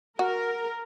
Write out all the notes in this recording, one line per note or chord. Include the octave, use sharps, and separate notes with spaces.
F#4 A#4